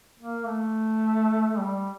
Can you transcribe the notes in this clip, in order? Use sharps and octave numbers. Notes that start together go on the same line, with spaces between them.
A#3
A3
G3